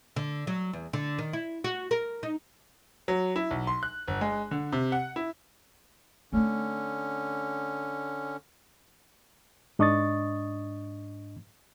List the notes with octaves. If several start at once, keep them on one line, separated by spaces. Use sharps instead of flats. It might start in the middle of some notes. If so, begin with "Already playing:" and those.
D3
F#3
E2
D3
D#3
E4
F#4
A#4
D#4
F#3
E4
B1
C6
F#6
G1
G#3
D3
C3
F#5
E4
D3 A3 C4 C#4
G#2 D4 D#5 C#6 D#6 A6